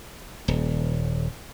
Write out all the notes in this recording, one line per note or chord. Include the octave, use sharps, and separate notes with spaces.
D#1